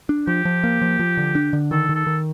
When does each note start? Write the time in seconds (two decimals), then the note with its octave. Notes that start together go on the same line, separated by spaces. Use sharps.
0.09 D4
0.27 F3 G4
0.45 F3
0.64 A#3
0.82 F3
1.00 F3
1.17 D3
1.35 D4
1.53 D3
1.71 D#3 A4
1.89 D#3
1.95 A4
2.07 D#3